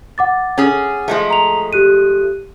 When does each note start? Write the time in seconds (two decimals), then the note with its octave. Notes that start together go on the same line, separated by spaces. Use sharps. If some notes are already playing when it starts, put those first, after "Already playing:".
0.18 F#5 D6 A6
0.58 C#4 G#4
1.08 F3 G#3 A3
1.30 A#5 F7
1.73 G4 F#6 D#7